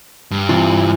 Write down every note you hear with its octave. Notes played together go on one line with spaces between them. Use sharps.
G2
C3 E3 F4